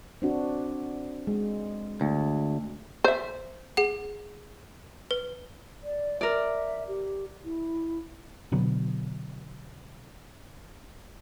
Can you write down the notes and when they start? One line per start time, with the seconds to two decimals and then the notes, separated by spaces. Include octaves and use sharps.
0.22 C4 D4 F#4
1.27 G#3
2.01 D2
3.04 C5 E5
3.77 G#4 F#5
5.11 B4
5.83 D5
6.21 A#4 D5 E5
6.88 G4
7.44 E4
8.52 B2 D3 F#3 B3